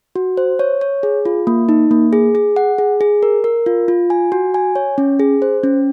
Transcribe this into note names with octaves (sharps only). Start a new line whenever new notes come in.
F#4
C5
C#5
C#5
G#4
F4
A#3
D#4
A#3
G#4
G#4
F#5
G#4
G#4
A#4
A#4
F4
F4
G#5
F#4
G#5
C#5
C#4
G#4
C5
C#4